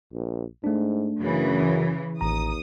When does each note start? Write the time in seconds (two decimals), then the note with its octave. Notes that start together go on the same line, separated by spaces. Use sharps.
0.13 A#1
0.64 G#2 A3 D4
1.20 F#2 C#3 E3
2.21 A1 D#2 A#5 D#6